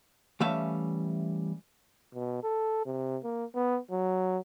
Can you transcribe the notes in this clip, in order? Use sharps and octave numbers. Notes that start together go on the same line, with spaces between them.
E3 G3 A3 C#4 E5 F5
B2
A4
C3
A#3
B3
F#3